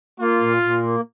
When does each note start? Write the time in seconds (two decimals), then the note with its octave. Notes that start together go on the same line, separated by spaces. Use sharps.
0.20 A#3 F4
0.41 A#2
0.62 A#2
0.83 A#3